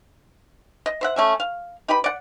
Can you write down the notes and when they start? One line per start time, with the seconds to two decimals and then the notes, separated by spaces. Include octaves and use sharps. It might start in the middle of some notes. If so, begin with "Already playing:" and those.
0.86 D#5
1.01 C5 E5 F#5
1.16 A3 C#4 E5
1.40 F5
1.88 D#4 G4 B4 B5
2.04 D5 F#5